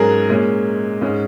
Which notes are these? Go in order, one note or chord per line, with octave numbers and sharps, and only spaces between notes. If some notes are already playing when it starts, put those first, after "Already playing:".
Already playing: G#2 F#3 C#4 G#4 A#4
A#2 G#3 C#4
G#2 G#3 C#4